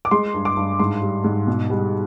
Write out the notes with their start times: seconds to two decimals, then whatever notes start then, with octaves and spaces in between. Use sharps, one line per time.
0.05 D6
0.11 G#3 C6
0.34 G2
0.45 D6
0.57 G2
0.79 G#2 C6
1.02 G3
1.24 G#2
1.47 B2
1.70 G3